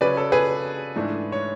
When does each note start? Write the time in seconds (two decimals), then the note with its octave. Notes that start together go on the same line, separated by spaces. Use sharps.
0.01 C#3 F#3 C#4 B4 D5
0.17 A4
0.32 G#4 B4
0.96 G#2 E3 A3 D4
1.32 C#5